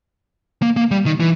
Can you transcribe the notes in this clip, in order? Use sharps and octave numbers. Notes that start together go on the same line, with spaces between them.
A#3
A#3
G3
D#3
E3